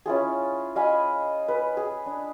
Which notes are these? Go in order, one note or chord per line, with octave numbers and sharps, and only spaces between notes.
C#4 E4 F4 G#4
D#5 F5 G#5 B5
B4
G#4
D4